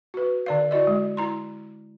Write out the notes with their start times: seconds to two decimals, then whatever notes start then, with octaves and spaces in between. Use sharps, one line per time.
0.14 F#4 B4
0.46 D3 D5 F5
0.71 E4 F#4 D5 D#5
0.87 G#3
1.17 E4 A#5 C6